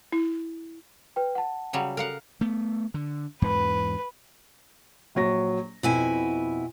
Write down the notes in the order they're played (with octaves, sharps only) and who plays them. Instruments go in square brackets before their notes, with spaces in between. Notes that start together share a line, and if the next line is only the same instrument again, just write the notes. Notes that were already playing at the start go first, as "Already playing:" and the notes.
[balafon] E4
[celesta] B4 G5
F#5 A5
[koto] C#3 F#3 G3
[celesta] A4 [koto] A#4 F5 F#5
[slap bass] A3 B3
D3
[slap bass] E2 G#2 [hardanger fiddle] B4
[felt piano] A#1 F#3 A#6
[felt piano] F2 [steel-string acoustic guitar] B2 E4 G#5